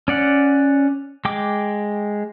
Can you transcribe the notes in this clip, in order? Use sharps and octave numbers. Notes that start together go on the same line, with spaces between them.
C#4 D5 F#5
G#3 G5 D6